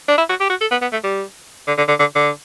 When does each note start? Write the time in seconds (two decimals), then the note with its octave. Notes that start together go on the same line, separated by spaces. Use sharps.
0.08 D4
0.18 E4
0.29 F#4
0.40 G4
0.50 F#4
0.61 A4
0.71 B3
0.82 B3
0.92 A3
1.04 G3
1.68 D3
1.78 D3
1.88 D3
1.99 D3
2.15 D3